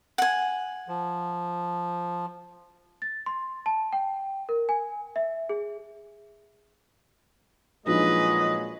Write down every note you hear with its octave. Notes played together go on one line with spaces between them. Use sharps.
F#5 G#5
F3
A6
C6
A5
G5
A#4
G#5
E5
G#4
A#2 F3 F#3 G#3 D4 D#4 B4 D#5